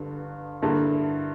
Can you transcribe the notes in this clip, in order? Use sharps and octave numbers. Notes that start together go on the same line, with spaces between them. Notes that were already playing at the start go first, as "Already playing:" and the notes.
Already playing: G1 G2 D3
G2 D3 A#3 E4